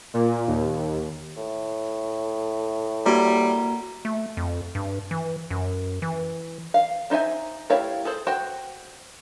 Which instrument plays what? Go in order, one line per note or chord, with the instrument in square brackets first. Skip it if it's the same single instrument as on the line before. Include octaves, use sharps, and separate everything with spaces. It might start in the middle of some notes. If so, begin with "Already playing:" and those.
[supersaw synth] A#2
D#2
[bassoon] A2
[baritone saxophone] G3 [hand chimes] A#3 F#4 A#5
[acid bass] A3
F2
G2
E3
F#2
E3
[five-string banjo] F5
D4 D#4 C5 E5 G#5
A3 E4 G4 C#5 F5
G#4 A4 C5
F#4 C5 F#5 G5